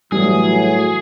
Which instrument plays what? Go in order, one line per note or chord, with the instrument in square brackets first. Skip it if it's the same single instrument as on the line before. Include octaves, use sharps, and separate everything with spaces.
[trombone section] A2 E3 F#3 [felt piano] G3 [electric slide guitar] G#4